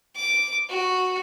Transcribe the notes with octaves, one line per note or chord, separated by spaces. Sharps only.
D6
F#4